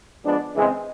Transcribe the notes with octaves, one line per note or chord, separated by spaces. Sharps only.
F3 G#3 B3 D4
C#3 E3 G#3 C4